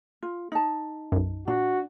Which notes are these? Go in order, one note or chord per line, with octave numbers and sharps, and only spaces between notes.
F4
D#4 A5
B1 F#2
A#2 D4 F#4